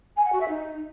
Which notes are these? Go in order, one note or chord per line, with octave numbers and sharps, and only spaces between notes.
G#5
F#5
F#4
E5
D#4